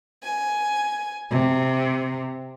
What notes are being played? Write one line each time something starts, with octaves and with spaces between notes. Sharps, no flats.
G#5
C3